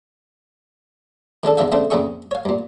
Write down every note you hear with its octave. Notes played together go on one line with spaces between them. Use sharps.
D#3 G#3 D4 A4
E2 D3 G#3 D4 E5 F5
C#3 A3 C4 D4 C5
F2 A#2 C#3 G#4 E5 C#6
C#5 F5
G2 A#2